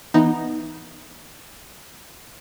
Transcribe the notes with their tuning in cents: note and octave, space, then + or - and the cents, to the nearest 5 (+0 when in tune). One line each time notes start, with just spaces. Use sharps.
E3 +0 B3 -10 D#4 +0